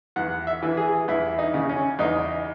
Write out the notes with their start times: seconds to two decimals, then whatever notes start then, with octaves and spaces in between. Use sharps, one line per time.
0.16 E2 F#5
0.47 E5
0.62 E3
0.77 G#4
1.08 E2 E4
1.39 D#4
1.54 C#3
1.69 C#4
1.99 E2 D#4